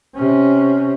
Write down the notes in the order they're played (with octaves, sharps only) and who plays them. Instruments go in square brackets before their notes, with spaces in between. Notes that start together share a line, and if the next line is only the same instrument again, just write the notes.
[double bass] C3 C#4